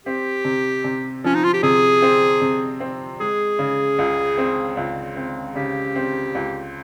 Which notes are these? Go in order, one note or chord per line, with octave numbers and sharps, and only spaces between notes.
C4 G4
C3
C3
F3 C#4
D#4
F4
G4
C3 G#4
C4
C3
C4
G#3 G#4
C#3
C#2
C4
C#2
C4
C#3 G4
C4
C#2